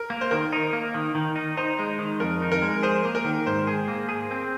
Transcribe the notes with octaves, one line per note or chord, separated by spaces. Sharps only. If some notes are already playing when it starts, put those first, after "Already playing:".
Already playing: A#4
A#3
C5
D#3 A#4
D#4
A#3
D#3
D#3
D#4
D#4 C5
G#3
D#3
F2 A#4
D#4
A#4
G#3
G#4 C5
A#3
A#4
D#3
G#2 C5
G#4
A#3
G#4
C4